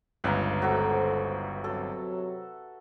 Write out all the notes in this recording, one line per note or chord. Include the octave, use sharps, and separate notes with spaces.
G1 C#2 B4 F5 A#5
F#4 A4 C5 E5
C3 F#3 A4